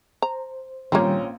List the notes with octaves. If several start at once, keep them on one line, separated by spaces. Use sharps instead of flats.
C5 A#5
A#1 D#3 G3 A#3 C4 C#4 G5 A#5